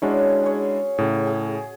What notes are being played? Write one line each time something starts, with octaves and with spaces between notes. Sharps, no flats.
G#3 C#4 D4 E4 F#4 C#5
G#4 C#5
A2 C#3 G#4
G#4